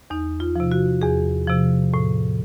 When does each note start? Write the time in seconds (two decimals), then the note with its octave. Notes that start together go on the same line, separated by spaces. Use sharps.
0.10 E2 D#4
0.40 F4
0.55 C3 F3
0.71 F#4
1.02 E2 G#4
1.48 C3 F3
1.94 A2